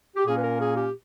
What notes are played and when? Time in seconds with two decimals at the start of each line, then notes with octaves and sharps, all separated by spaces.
0.16 G4
0.25 A#2 A#3 C#4 G#4
0.36 B4
0.41 A#4
0.59 G#4
0.75 G4